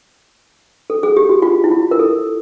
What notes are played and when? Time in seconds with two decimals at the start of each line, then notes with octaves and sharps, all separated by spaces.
0.90 A4
1.03 G#4
1.17 G4
1.29 F#4
1.42 F4
1.64 E4
1.71 F4
1.91 A#4
1.99 A4